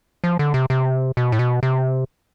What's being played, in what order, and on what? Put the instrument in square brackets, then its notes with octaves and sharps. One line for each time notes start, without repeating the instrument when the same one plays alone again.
[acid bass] F3
D3
C3
C3
B2
A2
B2
C3